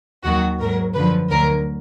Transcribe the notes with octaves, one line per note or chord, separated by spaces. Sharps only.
D#2 D#3 F#3 F#4
G#2 F#3 A#4
F#2 D3 F3 B4
D2 D3 F#3 A#4